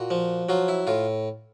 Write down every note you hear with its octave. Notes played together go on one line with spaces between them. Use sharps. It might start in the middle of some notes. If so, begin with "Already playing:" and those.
Already playing: A#2 F#4
F3
F#3 F4
E4
A2 F4